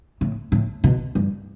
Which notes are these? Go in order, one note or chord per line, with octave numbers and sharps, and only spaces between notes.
A2
A2
B2
G2